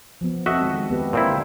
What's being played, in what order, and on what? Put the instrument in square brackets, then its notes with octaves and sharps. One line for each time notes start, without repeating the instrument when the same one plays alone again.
[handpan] F3 B3
[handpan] C4 A4 [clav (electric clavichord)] F#4 D#5 E5
[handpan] D#3 G#3
B3 G4 B4
[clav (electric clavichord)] A#2 C4 E4
[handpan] D3 G4